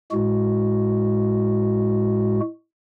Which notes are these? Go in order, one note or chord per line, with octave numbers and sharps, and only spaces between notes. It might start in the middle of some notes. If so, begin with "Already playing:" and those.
A2 G#3 F#4